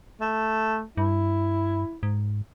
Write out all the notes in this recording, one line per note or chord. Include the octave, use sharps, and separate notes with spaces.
A3
G2 E4
G#2